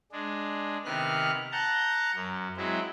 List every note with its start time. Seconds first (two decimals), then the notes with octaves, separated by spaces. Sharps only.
0.12 G#3 D4
0.85 C3 D#3 B3 F6 F#6
1.52 F#5 A5 A#5 G6
2.15 F#2
2.57 F#3 G#3 C4 E4